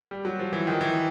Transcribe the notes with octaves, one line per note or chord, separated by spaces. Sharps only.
G3
F#3
F3
E3
D#3
E3